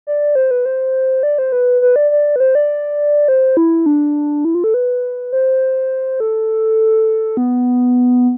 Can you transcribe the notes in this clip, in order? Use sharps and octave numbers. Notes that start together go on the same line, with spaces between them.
D5
C5
B4
C5
D5
C5
B4
B4
D5
D5
B4
C5
D5
C5
E4
D4
E4
F4
A4
B4
C5
A4
B3